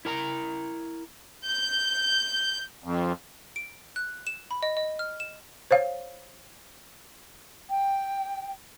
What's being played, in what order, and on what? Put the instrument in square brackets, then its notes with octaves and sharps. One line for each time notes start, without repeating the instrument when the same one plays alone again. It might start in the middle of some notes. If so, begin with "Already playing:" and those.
[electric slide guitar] E4 A#4 A5 A#5
[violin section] G6
[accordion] F2
[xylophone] D7
F#6
E7
B5
D#5
D#5
F6
E7
[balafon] C5 C#5 F5
[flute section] G5